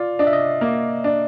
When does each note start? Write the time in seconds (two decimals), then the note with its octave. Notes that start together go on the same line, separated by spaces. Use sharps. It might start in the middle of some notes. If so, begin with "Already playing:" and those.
Already playing: F4 D5
0.19 D4 D#5
0.27 E5
0.33 D#5
0.61 A#3
1.04 D4